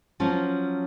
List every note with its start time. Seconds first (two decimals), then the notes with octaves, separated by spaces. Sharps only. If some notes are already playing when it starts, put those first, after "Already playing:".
0.20 F3 F#3 C#4